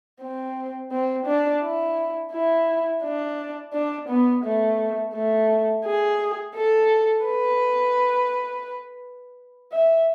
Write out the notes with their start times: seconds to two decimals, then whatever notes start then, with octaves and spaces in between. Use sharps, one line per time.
0.21 C4
0.91 C4
1.26 D4
1.63 E4
2.33 E4
3.04 D4
3.74 D4
4.09 B3
4.44 A3
5.14 A3
5.85 G#4
6.56 A4
7.25 B4
9.72 E5